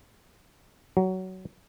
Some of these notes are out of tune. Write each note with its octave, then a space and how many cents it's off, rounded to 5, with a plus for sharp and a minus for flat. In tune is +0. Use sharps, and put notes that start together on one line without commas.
F#3 +15